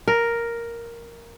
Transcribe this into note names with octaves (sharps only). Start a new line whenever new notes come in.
A#4